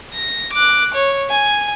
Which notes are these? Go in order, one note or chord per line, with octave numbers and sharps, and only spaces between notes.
A#6
D6 F#6
C#5
G#5